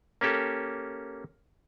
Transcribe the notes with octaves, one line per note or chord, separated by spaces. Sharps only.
A#3 C#4 G4 A4